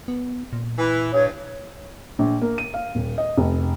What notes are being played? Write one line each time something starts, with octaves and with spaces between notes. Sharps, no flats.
B3
A#2
E3
G2 C#5
A#1
A#3
D#7
F5
D#1
D#5
F1